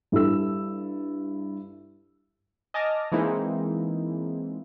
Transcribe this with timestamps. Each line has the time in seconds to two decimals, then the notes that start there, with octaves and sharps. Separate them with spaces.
0.12 G2 E4 G4 A4 E6
2.74 D#5 G#5 A5 D6 F6 A#6
3.12 E3 G#3 A#3 C4 D#4 E4